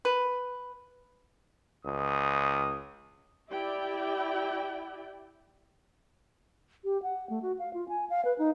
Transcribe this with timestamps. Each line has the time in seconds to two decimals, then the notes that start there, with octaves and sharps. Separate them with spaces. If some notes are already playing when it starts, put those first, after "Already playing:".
0.05 B4
1.85 C#2 D#6
3.50 E4 G4 D5 E5 G5
6.84 G4
7.03 F#5
7.30 A3
7.42 F#4
7.59 F5
7.74 F4
7.89 G#5
8.10 F5
8.25 B4
8.39 D#4